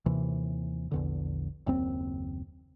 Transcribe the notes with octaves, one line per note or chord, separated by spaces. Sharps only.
D#2 C3 E3
A#1 E2 D3
F#1 D#2 C4